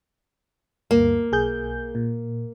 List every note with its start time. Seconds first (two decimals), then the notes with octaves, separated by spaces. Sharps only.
0.91 D2 G2 A#3
1.32 B1 G#4 G6
1.95 A#2